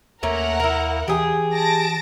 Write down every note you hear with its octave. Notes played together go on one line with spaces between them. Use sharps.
D#2 A3 A#3 C#4 A#4 F#5
A#3 E4
E3 G4 G#4
A5 A#6 D7